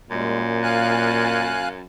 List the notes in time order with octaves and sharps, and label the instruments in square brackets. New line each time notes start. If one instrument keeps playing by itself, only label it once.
[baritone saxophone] F#2 [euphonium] A#2 [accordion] G3 G#3
[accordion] F5 G#5 F#6